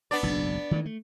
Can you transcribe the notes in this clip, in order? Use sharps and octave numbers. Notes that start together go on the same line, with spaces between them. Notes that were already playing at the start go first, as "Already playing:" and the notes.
B3 D4 D5
F#1 B1 G#2
D#3 E3 A3
A3